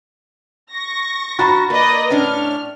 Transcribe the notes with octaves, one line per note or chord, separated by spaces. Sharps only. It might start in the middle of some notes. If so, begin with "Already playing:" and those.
C#6 A#6
F4 F#4 A#5 B5 A6
A#3 B4 D5 D#5
A2 C#4 D4 F6